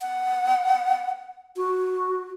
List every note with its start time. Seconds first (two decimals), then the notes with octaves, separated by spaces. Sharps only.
0.01 F#5
1.57 F#4